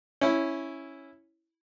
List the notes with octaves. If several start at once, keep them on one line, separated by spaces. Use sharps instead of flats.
C#4 E4